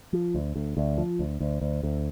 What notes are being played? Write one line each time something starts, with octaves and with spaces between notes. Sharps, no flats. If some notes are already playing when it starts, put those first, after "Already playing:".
F3
D2
D2
D2
F3
D2
D2
D2
D2